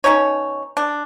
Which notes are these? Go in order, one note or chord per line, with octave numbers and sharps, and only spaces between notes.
B2 C#4 D#4 C#5
D4